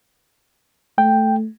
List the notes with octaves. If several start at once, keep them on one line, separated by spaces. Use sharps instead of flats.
A3 G5